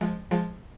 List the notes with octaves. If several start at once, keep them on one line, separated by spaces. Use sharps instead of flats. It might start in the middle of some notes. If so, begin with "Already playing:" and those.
F3 G#3
F3 G#3